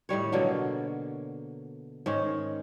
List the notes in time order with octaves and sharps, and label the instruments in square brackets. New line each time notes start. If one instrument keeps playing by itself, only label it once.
[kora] A2 D#3 G3 C#5
B2 D3 F#3 A#3
G#2 D#3 C#4